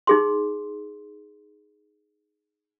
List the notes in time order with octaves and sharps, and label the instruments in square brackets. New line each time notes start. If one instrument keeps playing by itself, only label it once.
[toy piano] D#4 G#4 C6